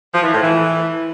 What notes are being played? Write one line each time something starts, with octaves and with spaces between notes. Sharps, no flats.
F3
E3
A2
E3